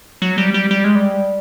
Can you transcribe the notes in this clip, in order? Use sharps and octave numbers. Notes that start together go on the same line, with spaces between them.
F#3
G3
G3
G3
G#3
G3